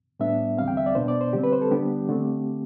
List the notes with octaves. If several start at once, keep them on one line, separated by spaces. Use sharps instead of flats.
A2 G3 B3 D4 E5
E2 D3 G3 C4 F5
G5
E5
D5
B2 B3 D4 C5
D5
C5
D3 G3 C4 G4
B4
C5
A4
D3 G3 B3 D4 G4
D3 A3 C4